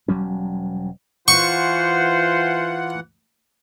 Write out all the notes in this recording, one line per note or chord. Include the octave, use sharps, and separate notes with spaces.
E1 F#3 G3 C#4
E3 F4 C5 F#5 C#6